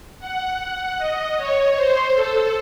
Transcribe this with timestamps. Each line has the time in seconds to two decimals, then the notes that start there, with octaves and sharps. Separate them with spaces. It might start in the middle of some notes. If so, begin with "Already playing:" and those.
0.19 F#5
0.58 F#5
0.98 D#5
1.37 C#5
1.76 C5
2.14 A4